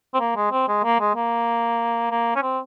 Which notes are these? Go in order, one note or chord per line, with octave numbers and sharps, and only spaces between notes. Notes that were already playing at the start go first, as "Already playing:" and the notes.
C4
A#3
G#3
C4
G#3
A#3
G#3
A#3
A#3
C#4
C4